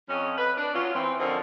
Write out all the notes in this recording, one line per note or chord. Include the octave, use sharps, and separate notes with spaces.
F2 C#4 D#5
B4
D4
F#3 C#4 F4
E3 C4
D3 F3 C4 C#4 A#4 D#5